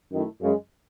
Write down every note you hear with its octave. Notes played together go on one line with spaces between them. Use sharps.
F#2 D#3 A3 E4
F#2 C#3 G#3